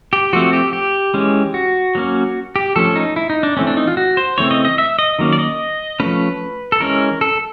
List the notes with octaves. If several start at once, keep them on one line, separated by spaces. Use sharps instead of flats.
G4
F3 A3 C4 F#4
G4
G4
E3 G#3 C#4
F#4
F#3 A#3 C#4
G4
F3 A3 C#4 A4
D#4
E4
D#4
D4
E3 A3 C4 C#4
D4
D#4
F4
F#4
C5
C#3 E3 A3 C4 C#5
D#5
D#5
E5
D#5
D#3 F#3 A#3 C#4
D5
D#5
F3 A3 C#4 B4
A4
E3 G#3 C#4 A#4
A4